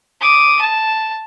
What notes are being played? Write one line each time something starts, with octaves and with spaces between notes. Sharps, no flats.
D6 D#6
A5